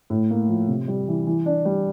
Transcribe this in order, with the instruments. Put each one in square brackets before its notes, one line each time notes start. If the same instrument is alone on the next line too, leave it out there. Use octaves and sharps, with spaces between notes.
[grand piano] A2
A#3
F3
C3
G3
E3
E3
D4
G3